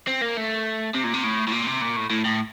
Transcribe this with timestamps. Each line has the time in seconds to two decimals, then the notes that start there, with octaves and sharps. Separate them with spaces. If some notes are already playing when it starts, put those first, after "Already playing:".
0.08 C4
0.22 A#3
0.37 A3
0.95 C3
1.04 A#2
1.14 C3
1.24 A2
1.48 A2
1.52 A#2
1.67 C3
1.82 A#2
1.96 A2
2.10 A2
2.25 A2